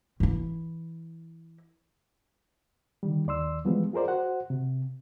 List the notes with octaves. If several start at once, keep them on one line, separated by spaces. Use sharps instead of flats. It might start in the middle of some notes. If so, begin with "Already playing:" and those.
E3 E4
D3 D#3 G3
D#2 D5 C6 E6
E3 F3 G3 G#3 B3
F4 G#4 A#4 C5 D5
F#4 C5 F#5
C3